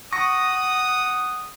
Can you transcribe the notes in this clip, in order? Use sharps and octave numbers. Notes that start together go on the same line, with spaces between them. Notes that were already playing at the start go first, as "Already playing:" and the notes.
F#5 C#6 D#6 A#6